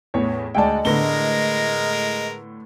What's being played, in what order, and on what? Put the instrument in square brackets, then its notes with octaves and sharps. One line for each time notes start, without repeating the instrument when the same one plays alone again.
[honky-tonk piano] E2 A2 E3 [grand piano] C#5
[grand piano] D2 G#3 A5 [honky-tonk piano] D5 F#5 G5 [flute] D#5
[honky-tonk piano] A2 A3 B3 [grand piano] D3 A#6 G7 [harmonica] G#3 A#4